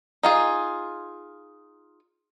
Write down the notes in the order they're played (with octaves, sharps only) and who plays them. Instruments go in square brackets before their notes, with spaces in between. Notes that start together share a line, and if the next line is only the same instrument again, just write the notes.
[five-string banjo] D#4 F4 G#4